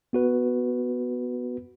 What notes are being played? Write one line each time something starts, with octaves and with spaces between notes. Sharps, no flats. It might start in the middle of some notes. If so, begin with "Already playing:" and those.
B3 F#4 B4